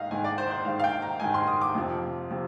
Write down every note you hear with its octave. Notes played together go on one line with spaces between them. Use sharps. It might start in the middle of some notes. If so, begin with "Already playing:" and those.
Already playing: G#2 D#3 D#5 F5
G#2 D#3 G#5
D5
C5
C5
G#2 D#3 F5
F5
G5
A#5
G#2 D#3 G#5
C6
D#6
D6
F2 C3 F3
C3 F3